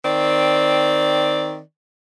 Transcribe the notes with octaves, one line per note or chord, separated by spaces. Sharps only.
D#3 C4 D5